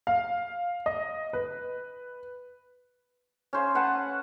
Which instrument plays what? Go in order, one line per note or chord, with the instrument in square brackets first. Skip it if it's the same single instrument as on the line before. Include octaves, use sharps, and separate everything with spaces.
[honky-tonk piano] F5
D#5
B4
[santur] C#4 C5 F5
B4 F#5 G#5 A5